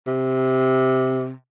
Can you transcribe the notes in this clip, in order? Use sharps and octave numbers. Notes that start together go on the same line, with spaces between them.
C3